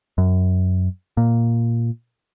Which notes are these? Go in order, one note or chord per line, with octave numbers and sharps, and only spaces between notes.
F#2
A#2